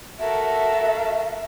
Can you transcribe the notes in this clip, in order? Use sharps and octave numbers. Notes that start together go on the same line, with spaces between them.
F#4 A4 A#4 E5